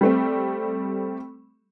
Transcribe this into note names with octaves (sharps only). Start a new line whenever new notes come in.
G3 A3 C4